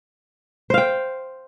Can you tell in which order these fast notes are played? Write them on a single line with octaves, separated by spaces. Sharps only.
C5 F5 G5